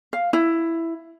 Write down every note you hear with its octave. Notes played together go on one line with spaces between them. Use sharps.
F5
E4